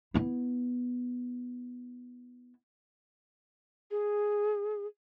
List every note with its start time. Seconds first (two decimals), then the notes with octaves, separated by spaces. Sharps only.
0.14 B3 E4
3.91 G#4